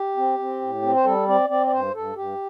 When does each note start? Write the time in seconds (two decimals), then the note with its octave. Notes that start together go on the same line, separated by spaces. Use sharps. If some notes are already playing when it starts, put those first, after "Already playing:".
Already playing: G4
0.17 C4
0.39 C4
0.61 A2
0.82 C4
0.94 C5
1.04 G3 A4
1.27 C4 D5
1.49 C4 D5
1.66 D5
1.72 G2 C5
1.94 G2 A4
2.16 G2 G4